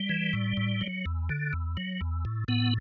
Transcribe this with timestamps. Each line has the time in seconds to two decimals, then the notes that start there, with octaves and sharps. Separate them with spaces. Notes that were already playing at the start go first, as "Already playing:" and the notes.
Already playing: G3
0.09 E3
0.33 A2
0.57 A2
0.81 F#3
1.06 E2
1.29 D3
1.53 E2
1.77 F#3
2.01 E2
2.25 A2
2.48 A2 B3